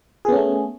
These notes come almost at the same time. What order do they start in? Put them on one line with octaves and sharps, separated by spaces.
G#4 B3 C#4 A3